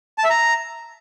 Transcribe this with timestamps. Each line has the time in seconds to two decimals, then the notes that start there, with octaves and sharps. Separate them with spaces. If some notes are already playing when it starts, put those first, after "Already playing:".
0.18 A5
0.24 E5
0.30 A#5